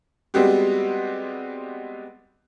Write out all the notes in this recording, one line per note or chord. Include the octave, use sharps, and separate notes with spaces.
G3 G#3 B3 C4 F#4 G4